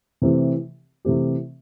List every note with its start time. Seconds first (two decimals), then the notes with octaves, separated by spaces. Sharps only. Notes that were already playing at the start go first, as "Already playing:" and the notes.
0.22 C3 E3 A3 C4 G4
1.05 C3 E3 A3 C4 G4